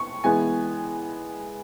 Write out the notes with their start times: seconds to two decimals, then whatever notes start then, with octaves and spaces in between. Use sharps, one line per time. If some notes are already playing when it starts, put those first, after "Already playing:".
Already playing: C#6
0.24 E3 G#3 B3 G#5